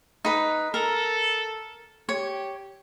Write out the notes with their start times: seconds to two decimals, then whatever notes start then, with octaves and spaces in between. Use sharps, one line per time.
0.25 D#4 B4
0.74 A4 A#4
2.09 G4 C#5